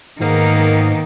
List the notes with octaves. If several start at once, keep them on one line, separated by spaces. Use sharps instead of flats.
G#2 D#3 A#3 B3 D#4